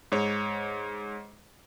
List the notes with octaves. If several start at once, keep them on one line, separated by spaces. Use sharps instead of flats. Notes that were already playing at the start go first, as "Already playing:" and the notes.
G#2 C#5